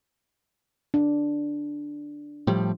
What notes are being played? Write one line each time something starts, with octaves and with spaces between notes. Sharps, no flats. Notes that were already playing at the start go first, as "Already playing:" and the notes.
D4
A2 F3 G3